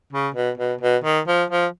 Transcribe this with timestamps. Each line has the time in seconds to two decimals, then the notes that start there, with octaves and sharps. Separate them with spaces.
0.13 C#3
0.34 B2
0.57 B2
0.81 B2
1.04 D#3
1.27 F3
1.50 F3